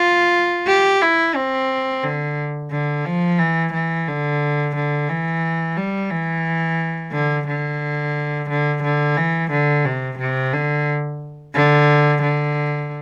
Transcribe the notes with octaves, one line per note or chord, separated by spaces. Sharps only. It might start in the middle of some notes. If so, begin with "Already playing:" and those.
Already playing: F4
G4
E4
C4
D3
D3
F3
E3
E3
D3
D3
E3
G3
E3
D3
D3
D3
D3
E3
D3
C3
C3
D3
D3
D3